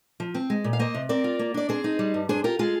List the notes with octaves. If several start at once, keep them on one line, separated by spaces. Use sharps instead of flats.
F3
C4
G#3
A#2
F5
A#3 C5 D#5
C3
C4 A#4 D5
F4
A#3
D4 D5
C4 G#4 C5
D#4
G3
G2
D4 G#4 C5
F4 G4 A#4
G#3 F4 G#4